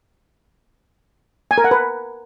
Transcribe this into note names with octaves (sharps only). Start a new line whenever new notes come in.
G#5
A#4
F#5
B4